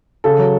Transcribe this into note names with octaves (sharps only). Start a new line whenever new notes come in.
C#3 A4
F#3